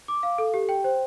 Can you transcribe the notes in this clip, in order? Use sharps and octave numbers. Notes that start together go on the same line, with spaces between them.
D6
F5
A4
G4
G5
C5